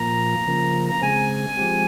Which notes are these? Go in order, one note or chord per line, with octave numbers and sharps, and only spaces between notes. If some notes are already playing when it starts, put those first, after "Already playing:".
Already playing: A#2 F3 A#3 A#5
C#3 F3 A#3
A#5
C#3 G#3 C4 G#5
F3 G#3 C4 G4